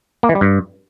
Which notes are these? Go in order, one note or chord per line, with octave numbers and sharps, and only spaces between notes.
A#3
E3
G3
G2